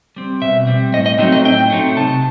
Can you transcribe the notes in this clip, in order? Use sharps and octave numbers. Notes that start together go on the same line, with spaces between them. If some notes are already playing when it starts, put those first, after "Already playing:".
G3 C4
B2 E5
G3 C4
A2 D#5
D#5
F#3 A3 C4 D#4
D#5
A2 G5
F#3 A3 C4 D#4
C3 A5